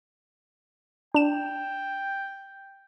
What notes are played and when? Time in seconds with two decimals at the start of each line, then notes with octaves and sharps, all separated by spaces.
1.14 D4 G5 E7